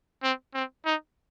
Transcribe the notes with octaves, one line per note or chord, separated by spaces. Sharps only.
C4
C4
D#4